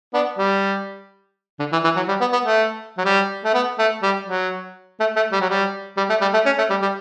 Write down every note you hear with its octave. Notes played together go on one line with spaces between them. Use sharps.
B3 D4
G3
D3
E3
E3
F#3
G3
B3
B3
A3
F#3
G3
A3
B3
A3
G3
F#3
A3
A3
G3
F#3
G3
G3
A3
G3
A3
C#4
A3
G3
G3